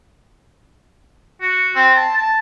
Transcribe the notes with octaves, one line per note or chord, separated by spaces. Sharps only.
F#4
C4
A5
A5